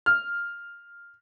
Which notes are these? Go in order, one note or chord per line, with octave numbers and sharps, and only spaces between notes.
F6